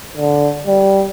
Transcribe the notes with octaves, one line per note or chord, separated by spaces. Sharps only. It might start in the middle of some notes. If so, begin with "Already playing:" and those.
D3
G3